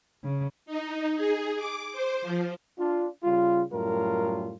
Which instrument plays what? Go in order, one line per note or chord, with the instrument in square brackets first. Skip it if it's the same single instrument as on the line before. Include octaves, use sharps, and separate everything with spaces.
[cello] C#3
[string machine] D#4
G#4
D6
C5
F3
[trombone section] D4 F4
C#3 G3 F4
F#2 A2 G3 F4 A#4